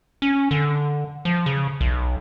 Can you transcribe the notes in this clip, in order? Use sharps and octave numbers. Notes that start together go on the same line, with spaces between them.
C#4
D3
F3
C#3
B1